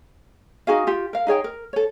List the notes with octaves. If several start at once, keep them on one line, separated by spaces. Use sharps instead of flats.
D#4 F#4 G#4 F5
F4 G4
A#4 F5
D#4 G#4 C#5 G5
A#4
A4 C#5